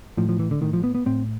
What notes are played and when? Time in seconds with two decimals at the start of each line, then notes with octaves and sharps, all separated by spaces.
0.17 A2 F3
0.29 F3
0.39 E3
0.51 D3
0.61 A2 D#3
0.73 F3
0.84 B3
0.95 B3
1.06 A2 C4